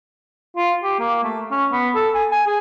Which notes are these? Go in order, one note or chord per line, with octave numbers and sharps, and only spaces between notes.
F4
G4
A#3
A3
C#4
B3
A4
G#5
G#5
G#4